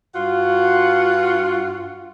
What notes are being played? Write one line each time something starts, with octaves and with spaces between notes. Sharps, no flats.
G2 F4 F#4 F#5